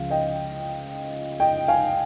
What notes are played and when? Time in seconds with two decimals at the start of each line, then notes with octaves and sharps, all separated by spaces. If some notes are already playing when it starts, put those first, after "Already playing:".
Already playing: C#2 C#3 F3 F5
0.10 D#5 G5
1.40 D#5 G5
1.68 F5 G#5